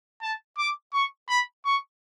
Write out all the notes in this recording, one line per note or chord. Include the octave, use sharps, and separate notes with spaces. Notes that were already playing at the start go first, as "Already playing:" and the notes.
A5
D6
C#6
B5
C#6